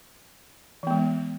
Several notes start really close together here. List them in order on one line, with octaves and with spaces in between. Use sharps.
E3 B3 G#3